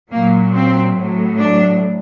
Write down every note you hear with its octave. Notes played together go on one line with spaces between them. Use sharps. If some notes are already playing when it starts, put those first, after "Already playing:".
A#2 F#3 A#3
C4
A2 F#3
D4